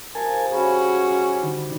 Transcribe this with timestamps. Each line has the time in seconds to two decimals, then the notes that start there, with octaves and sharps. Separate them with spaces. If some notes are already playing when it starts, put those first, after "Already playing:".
0.15 C3 F3 A#4 G#5 A5
0.51 C#3 G3 C#4 F#4 G#4 B5
1.07 D#4 C5 D5
1.43 D3 D#3